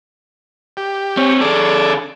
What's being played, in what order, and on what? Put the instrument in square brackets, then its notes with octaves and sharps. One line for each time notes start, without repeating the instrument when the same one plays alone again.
[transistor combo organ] G4
[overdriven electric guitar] C4 C#5
[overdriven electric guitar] D3 G#4 [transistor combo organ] A4 D5